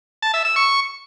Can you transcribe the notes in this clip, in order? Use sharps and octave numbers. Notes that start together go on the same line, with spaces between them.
A5
E5
E6
C#6